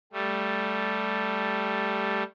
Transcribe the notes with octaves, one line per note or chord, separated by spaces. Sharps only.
G3 A3